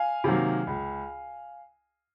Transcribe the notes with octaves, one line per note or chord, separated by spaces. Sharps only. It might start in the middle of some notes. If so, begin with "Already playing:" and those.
Already playing: F5 G#5
C3 D#3 F#3 A#3
C#2